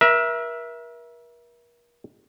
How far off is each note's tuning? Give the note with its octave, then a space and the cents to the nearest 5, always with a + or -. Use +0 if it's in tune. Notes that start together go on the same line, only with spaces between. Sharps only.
A#4 +40 E5 +0